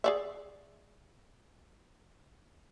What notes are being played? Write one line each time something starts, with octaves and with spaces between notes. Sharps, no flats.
G#4 D5 E5